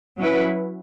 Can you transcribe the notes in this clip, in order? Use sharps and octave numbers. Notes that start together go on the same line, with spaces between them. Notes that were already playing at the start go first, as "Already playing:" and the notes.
F#3 C#4 E4 B4